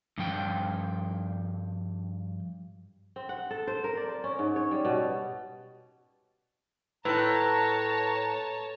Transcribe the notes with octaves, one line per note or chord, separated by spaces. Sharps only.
G2 F3 G5
C4
F#5
A4
C5
A#4
D5
C5
C#4
G#2
C#5
G3
B2
A2 B4 C#5 A5 A#5 C6 F#6